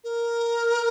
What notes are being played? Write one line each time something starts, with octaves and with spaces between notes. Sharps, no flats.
A#4